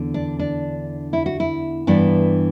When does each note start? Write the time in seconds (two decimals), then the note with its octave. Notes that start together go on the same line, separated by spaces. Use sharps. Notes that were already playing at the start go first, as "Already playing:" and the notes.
Already playing: E2 D3
0.14 D4
0.39 D4
1.13 E4
1.26 F#4
1.40 E4
1.87 G2 E3 B3 D4